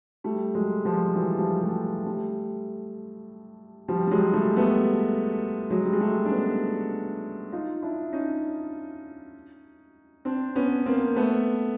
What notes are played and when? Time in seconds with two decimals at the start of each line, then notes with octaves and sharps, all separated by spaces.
0.24 G3 A3
0.55 F#3 G#3
0.85 F3 G3
1.15 E3 F#3
1.38 F3 G3
1.61 G3 A3
2.06 G3 A3
3.88 F3 G3
4.07 G3
4.11 F#3 G#3
4.34 G3 A3
4.57 A3 B3
5.70 F#3 G#3
5.85 G3
5.93 G#3
6.00 G3 A3
6.25 D4
6.31 B3 C#4
7.52 D#4 F4
7.82 D4 E4
8.13 C#4 D#4
10.25 C4 D4
10.55 B3 C#4
10.86 A#3 C4
11.16 A3 B3